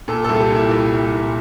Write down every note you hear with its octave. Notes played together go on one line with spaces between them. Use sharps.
A#2 A4
A4
C2
A4
G4
A#2 E4
C2
C2
A#2